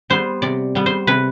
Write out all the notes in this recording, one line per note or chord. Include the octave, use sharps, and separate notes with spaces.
G3 B3 C5
C3 D5
G3 B3
C5
C3 B4